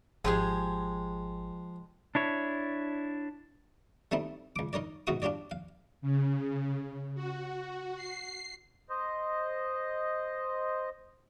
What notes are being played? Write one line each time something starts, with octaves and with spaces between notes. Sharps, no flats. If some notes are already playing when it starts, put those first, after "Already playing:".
G#1 F3 G#3 G4 G#4
D4 E4 C#5
G3 A3 C4 D#4 E4
C#2 D6
D#4 A#4 C#5 D5
G#2 B2 E3 F#4 C#6 D#6
D4 F4 G4 C#5 D5
F5
C#3
F#4
C7
C5 D#5